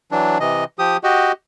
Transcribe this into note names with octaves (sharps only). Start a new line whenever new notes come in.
E3 F#3 D4
C3 E3 D#5
F3 G4 D#6
F#4 G4 D#5